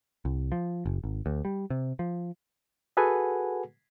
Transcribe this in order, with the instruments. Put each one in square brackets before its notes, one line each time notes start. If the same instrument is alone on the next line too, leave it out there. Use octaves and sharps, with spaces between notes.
[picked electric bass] C2
F3
F#1
G#1
D2
G3
C3
F3
[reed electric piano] F#4 G#4 A4 B4 F#5 G#5